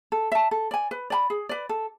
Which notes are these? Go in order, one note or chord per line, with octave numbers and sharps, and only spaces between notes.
A4
E5 A5
A4
D5 G#5
B4
D5 G#5 B5
G#4
B4 D5
A4